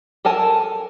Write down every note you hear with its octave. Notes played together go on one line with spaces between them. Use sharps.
A4 A#4 G#5 A5